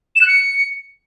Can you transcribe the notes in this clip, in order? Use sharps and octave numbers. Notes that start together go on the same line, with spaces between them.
E7
F#6
C#7